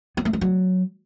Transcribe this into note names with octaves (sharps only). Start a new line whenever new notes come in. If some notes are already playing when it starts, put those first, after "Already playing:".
B3
A3
G#3
F#3